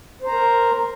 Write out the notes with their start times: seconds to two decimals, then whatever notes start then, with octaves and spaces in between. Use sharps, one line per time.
0.22 C5
0.27 A#5
0.32 A#4